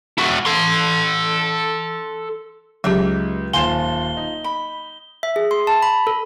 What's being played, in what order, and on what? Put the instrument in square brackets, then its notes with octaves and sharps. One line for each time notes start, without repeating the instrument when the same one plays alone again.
[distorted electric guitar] E4 F#4
A4 C6
[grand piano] C#2 [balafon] F#3 G4 [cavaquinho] D#4 E5
[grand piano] D#1 C5 E7 [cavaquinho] F4 G#5 A5 [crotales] G7
[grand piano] D#4
[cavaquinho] B5
[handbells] E5
G#4
C6
A5
B5
A4